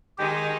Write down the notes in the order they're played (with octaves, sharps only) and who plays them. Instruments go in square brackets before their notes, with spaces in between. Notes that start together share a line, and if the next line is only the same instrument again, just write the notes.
[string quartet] D#3 G#3 D#4 [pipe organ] G4